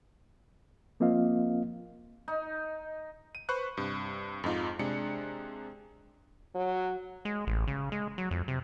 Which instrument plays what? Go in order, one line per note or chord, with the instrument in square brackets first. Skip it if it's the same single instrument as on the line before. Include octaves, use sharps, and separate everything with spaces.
[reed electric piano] F3 A#3 C4 F4 D#5 F5
[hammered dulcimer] D#4
[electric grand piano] D#7
B4 C5 B5 C#6 F#6
G2 C3
F2 G#2 D#4 F4
C3 G#3 D4 C#7
[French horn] F#3
[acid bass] G#3
A1
C#3
G#3
F#3
F2
C3